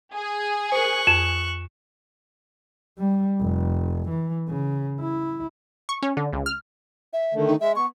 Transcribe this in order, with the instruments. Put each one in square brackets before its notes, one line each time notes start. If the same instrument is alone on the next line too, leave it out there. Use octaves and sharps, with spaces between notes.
[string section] G#4
[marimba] A#4 C5 [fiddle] C#6 F#6
[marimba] F2 [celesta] E7
[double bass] G3
F1
E3
C#3
E4
[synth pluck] C#6
C#4
D3
C#2
F6
[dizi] E5
[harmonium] D3 D#3 A3
[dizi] D#4
[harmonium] G#3 [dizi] E5
[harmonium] B3 [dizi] C#6